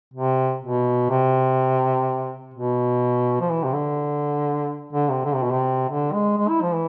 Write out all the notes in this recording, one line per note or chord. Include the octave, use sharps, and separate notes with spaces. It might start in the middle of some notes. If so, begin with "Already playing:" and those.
C3
B2
C3
B2
F3
E3
C3
D3
D3
C3
D3
C3
B2
C3
D3
G#3
G#3
E4
F3
E3